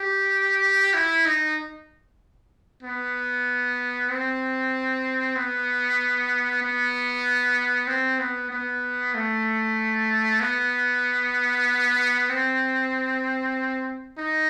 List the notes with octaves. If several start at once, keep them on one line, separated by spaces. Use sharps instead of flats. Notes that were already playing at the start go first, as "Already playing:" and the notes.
Already playing: G4
E4
D#4
B3
C4
B3
B3
C4
B3
B3
A3
B3
C4
D#4